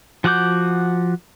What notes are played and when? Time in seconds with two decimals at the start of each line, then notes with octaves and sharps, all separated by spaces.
0.24 F3 F#4 F#5 D6 G6